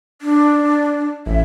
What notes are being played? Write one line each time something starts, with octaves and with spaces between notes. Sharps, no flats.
D4
A1 E5